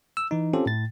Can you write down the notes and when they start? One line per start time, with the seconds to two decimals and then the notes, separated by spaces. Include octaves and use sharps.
0.17 E6
0.31 E3 D#4
0.53 C4 C#4 F4 G4 A4
0.66 A2 A6